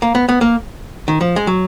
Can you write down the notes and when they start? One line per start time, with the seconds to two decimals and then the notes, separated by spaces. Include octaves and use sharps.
0.02 A#3
0.15 B3
0.29 B3
0.41 A#3
1.08 D#3
1.21 F3
1.36 G#3
1.47 F#3